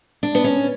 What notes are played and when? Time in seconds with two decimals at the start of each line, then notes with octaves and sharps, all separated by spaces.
0.23 D4
0.35 B3
0.44 C#4